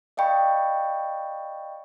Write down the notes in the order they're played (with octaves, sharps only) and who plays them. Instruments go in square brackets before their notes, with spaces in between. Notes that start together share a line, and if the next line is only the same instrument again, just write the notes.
[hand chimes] D5 D#5 F5 G5 B5 C#6